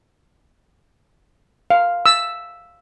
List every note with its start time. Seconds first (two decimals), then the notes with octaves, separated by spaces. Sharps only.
1.70 F5
2.06 E6